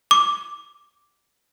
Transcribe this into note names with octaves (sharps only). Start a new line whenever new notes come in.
D6